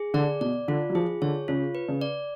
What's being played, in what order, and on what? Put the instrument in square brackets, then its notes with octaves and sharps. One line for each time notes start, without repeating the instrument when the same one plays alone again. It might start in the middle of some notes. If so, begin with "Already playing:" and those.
Already playing: [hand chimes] G#4
[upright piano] D3 [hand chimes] D5
[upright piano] B2 [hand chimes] D5
[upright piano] D3 [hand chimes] F4
[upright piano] F#3
[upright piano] F3 [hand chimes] G#4
[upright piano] D3 [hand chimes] C#5
[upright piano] C#3 [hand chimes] F4
[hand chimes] B4
[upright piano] C#3
[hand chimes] D5